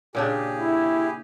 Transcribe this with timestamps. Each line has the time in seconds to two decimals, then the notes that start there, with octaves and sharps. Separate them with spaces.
0.15 A#2 C#3 D4 G4 G#4
0.57 E4